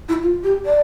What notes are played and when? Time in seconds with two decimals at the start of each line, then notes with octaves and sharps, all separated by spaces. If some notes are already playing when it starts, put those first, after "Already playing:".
0.09 E4
0.23 F4
0.44 G4
0.65 D5